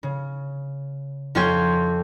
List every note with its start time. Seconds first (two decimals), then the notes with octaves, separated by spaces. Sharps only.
0.03 C#3
1.35 F2 C#4 F4 G5 C6 G#6